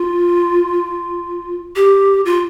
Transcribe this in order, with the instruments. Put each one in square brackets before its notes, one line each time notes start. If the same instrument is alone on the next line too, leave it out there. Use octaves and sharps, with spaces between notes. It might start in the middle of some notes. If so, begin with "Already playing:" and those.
Already playing: [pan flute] F4
G4
F4